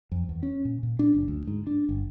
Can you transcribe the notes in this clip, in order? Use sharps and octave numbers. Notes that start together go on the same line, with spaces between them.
F2
E2
C#4
A#2
A#2
D4
F#1
D2
G#2
D4
G1